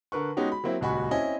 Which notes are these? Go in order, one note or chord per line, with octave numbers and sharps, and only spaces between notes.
D3 A#4 B4 C#6
G#3 B3 C#4 D#4 F#4 G4
B5
F#3 A#3 C4 E4
D#1 C#2 F#4 G#5 B5 C#6
C4 C#4 E4 D#5 G#5